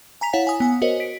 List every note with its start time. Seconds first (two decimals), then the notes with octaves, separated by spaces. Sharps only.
0.21 G#5 A#5 B6 F7
0.33 E4 C#5 F5 F#5 B6
0.47 G#5 D#6
0.60 B3 G#5
0.82 F#4 A#4 C5 C#5 D#5
1.00 B6 D7